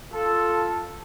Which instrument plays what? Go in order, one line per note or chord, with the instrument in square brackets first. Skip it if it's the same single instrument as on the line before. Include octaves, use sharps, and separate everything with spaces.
[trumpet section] F4 A4